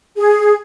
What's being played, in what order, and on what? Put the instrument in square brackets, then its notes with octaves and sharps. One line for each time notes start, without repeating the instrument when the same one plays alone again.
[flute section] G#4